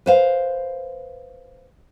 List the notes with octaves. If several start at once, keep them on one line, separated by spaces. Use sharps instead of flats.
B4 C5 F5